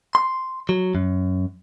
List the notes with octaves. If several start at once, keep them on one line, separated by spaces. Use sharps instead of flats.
C6
F#3
F#2